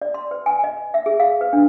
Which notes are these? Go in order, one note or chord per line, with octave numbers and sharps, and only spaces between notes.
D5
C6
B4
G#5
D#5
E5
G#4
F5
B4
D4